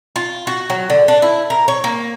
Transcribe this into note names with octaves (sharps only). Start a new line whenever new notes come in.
F4
F#4
F#3
D3
D4
E4
A#4
C#5
A#3